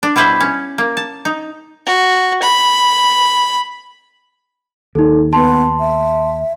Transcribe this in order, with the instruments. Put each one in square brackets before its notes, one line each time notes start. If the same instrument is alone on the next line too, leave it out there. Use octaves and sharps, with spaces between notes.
[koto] D4
B2 G3 E4 B4 C5
C#4
A#3
A5
D#4
[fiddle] F#4
B5
[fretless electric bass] D#2 [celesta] D#4 A4
[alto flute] B3 [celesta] A5 C6
[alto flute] E5